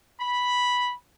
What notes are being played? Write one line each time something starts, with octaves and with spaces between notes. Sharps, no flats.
B5